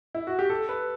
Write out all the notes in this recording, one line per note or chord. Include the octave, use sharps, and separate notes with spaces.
E4
F#4
G4
A4
B4